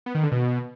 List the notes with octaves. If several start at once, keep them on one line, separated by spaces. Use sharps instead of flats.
B3
D#3
D3
B2